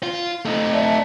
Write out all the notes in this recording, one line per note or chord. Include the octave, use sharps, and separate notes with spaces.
F4
A3 D#4
D5 E5 A5